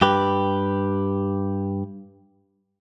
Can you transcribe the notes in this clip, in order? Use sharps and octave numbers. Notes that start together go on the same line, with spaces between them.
G2 G4 B4